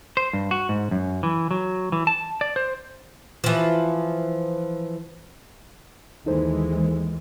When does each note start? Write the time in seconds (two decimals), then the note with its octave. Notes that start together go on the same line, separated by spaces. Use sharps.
0.17 C5
0.33 G2
0.51 F#4
0.69 G#2
0.91 F#2
1.23 E3
1.51 F#3
1.92 E3
2.07 A5
2.41 D5
2.56 C5
3.44 E3 F3
6.26 D#2 E3 G#3 D#4 A4 C5